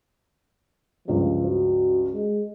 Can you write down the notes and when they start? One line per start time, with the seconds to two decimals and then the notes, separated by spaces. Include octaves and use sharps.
1.08 C#2 G2 F3
1.46 F#4
2.12 G#3